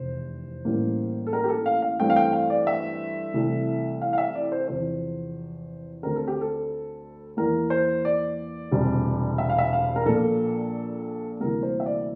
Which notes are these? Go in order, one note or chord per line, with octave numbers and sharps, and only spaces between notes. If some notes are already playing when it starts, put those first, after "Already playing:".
Already playing: F1 E2 C3 C5
A1 A2 G3 A#3
A4
A#4
G4
A4
F5
F5
G2 E3 A3 C4 G5
F5
G5
F5
D5
E5
C2 C3 E3 A3
F5
F5
E5
D5
C5
E2 C3 F3 C5
D2 D3 A3 C4 A#4
A4
G4
A4
E2 E3 A#3 A#4
C5
D5
E1 D2 C3 G3
E5
F5
E5
F5
A#4
A#1 A#2 F3 A#3 A4
D2 C3 E3 G3 A#3 A#4
C5
E5
D5